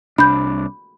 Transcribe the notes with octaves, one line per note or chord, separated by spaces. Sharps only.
C2 D4 B5 G6